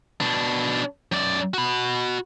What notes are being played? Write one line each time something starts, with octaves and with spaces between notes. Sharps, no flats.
B2 D4
F#2 D5
F#4 B5